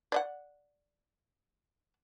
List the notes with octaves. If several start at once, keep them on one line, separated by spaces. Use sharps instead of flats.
D5 D#5 F#5